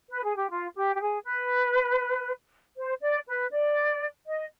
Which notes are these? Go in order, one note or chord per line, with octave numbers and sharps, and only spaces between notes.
B4
G#4
G4
F4
G4
G4
G#4
B4
C5
D5
B4
D5
D#5